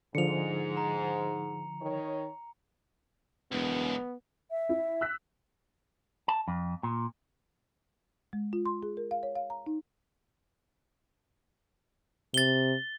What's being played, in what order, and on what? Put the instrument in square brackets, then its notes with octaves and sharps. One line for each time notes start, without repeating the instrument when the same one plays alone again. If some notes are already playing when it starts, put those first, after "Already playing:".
[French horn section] G#2 [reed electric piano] D3 F3 [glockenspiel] C#7 F7
[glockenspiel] A#5
[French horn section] D#3 C#5
[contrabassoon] E1 [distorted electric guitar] C#2 F#2 [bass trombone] B3
[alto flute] E5
[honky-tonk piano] E4
E6 F#6 B6
[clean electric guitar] A5
F2
A#2
[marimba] G#3
F4
C6
G#4
A#4
F5
C#5
F5
A#5
D#4
[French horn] C3 [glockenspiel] A6 G7